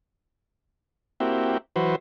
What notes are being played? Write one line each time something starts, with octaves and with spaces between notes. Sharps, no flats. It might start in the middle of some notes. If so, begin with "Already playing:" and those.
A#3 C4 E4 F#4 G4
E3 F#3 F#4 B4 C5